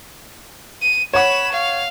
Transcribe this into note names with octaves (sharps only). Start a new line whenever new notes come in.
D#7
C#5 F#5 B5 C#6 E7
F5